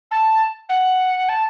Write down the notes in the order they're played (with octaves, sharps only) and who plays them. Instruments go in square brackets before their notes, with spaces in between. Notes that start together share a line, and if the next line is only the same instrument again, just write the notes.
[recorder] A5
F#5
A5